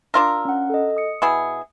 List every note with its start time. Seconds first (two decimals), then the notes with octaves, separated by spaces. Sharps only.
0.14 D4 F4 A#4 A#5 E6
0.45 C#4 F#5
0.70 A4 D#5
0.97 D#6 C#7
1.22 B2 E4 G#4